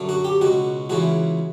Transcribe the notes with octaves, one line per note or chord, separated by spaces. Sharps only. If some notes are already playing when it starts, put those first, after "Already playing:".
Already playing: F#2 D3
F#4
G4
C#2 B2 F#4
C#2 C#3 E3 F#4